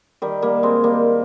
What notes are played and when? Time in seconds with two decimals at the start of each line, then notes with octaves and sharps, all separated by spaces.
0.22 D#3 G3
0.42 G3 A#3
0.63 G#3 C4
0.84 G3 A#3